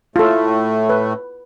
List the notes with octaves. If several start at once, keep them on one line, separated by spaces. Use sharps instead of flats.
A2 A3 F4 A4
B4